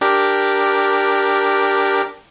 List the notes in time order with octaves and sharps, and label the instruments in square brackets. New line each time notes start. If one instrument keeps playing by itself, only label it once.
[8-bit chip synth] D4 G4 A#4